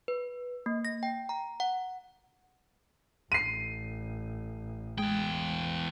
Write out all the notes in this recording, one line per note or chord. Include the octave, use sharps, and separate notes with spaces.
B4
A#3
A#6
G5
A#5
F#5
A1 C7 D#7
E2 G#3 G5